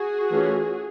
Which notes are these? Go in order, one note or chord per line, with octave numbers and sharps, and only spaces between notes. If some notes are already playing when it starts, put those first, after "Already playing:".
Already playing: F#4 G#4
E3 A3 C#4 F4